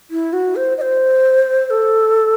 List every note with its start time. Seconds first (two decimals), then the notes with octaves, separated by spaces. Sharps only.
0.11 E4
0.33 F#4
0.56 C5
0.78 D#5
0.81 C5
1.67 C5
1.70 A4